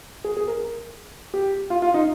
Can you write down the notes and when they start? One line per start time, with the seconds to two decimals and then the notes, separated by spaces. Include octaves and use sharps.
0.24 G#4
0.37 G#4
0.48 A#4
1.34 G4
1.70 F4
1.82 F4
1.94 D#4